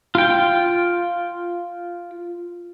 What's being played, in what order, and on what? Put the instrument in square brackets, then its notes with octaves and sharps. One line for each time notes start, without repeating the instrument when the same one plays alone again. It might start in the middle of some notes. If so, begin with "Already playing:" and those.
[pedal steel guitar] F4 G5